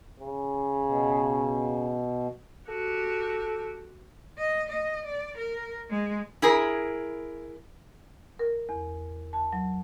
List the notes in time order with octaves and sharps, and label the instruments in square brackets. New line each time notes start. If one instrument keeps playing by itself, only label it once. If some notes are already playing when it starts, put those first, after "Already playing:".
[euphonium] C#3
[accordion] B2
[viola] F#4 G4 [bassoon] A4
[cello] D#5
D#5
D5
A#4
G#3
[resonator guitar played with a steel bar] E4 G#4 A#4
[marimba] A#4
E2
A5
F#3